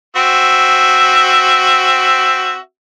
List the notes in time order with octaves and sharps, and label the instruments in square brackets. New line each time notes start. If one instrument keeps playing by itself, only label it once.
[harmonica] C4 F#4 E5